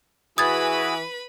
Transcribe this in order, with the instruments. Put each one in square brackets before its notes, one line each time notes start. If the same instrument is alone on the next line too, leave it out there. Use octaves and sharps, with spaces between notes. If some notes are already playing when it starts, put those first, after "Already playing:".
[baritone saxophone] E3 [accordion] F#4 G#4 [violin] B4 B5 [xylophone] D#6 G#6 A6